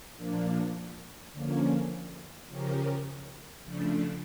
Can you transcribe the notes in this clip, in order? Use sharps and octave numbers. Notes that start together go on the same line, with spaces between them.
A#2 F3 A#3 D4
D3 F3 A#3 C#4
C#3 F3 C#4 G4 A#4
C#3 F3 A3 D4